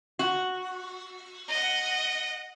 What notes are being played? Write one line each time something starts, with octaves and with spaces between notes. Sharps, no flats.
F#4
D#5 F#5